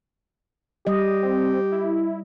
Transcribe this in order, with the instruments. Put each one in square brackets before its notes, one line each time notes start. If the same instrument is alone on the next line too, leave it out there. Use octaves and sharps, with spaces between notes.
[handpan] G3 D#5 [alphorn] G4
[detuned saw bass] C4
E4